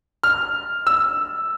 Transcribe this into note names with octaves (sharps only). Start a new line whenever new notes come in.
F6
E6